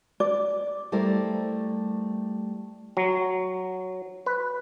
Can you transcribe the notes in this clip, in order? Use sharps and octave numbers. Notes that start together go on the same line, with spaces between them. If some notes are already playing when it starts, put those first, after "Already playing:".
D5
G3 A3 E4 A#4 C5
F#3
B4